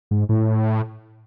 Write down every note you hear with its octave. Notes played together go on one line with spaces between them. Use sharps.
G#2
A2